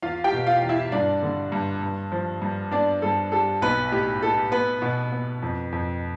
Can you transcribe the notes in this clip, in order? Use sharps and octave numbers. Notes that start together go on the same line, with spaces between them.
E2 F4 F5
G4 G5
B2
F4 F5
E2
E4 E5
G2 D4 D5
D3
G2
G2
F3
G2
B3 D4 D5
G2 A4
G3 A4
B1 B3 B4
A2 G4
A2 A4
B3 B4
B2
B3
F2
F2